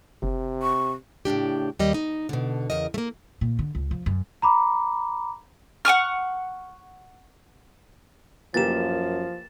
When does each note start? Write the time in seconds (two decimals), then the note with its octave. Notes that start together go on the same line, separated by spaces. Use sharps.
0.23 F#1 C3
0.62 C#6
1.25 A2 C#3 D4 G4
1.79 D#2 G3 D#5
1.94 D#4
2.29 B2 D3
2.70 E2 C#3 A#4 D#5
2.94 A3 A#3
3.41 A#2
3.59 D3
3.75 C#2
3.91 F3
4.06 F#2
4.42 A#5 B5 D6
5.85 F#5 G#5 C#6 F6
8.54 F#2 E3 F3 A#3 G4 A6 E7